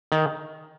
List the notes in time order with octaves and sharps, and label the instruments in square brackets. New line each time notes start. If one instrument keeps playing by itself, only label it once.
[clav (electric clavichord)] D#3